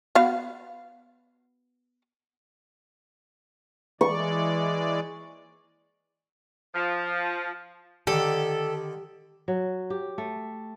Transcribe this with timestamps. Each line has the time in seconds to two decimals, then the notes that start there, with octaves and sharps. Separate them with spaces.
0.15 B3 F#4 F5
4.01 E3 G#3 D5 C#6
6.73 F3
8.07 D3 D#3 G4 A4
9.48 F#3
9.90 G4
10.18 A3